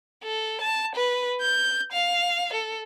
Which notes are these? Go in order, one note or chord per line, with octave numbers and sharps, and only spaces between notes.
A4
A5
B4
G6
F5
A4